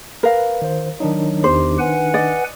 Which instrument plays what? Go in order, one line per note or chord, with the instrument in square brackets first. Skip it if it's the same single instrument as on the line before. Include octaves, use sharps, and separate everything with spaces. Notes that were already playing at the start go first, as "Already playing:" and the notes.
[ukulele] A#4 F5 [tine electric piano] B4
[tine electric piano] D#3 C5
[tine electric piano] D#3 D4 D#4 [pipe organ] F#3
[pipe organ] E2 G4 [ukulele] C5
[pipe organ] B4 F#5 G#5
[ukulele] D5 D#5